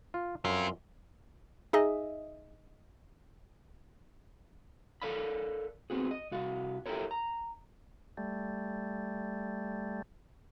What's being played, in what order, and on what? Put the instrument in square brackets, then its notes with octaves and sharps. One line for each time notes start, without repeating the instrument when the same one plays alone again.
[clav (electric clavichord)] F4
[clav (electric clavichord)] F#2 [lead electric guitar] C4 F4
[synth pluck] D#4 G#4 D#5 E5 G#5
[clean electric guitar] A4 A#4 D5 F5 B5
B3 C4 F#4 G#4
D#5
C2 F#4 F5
E4 G4 A4 A#4 C#5
A#5
[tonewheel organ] G3 A3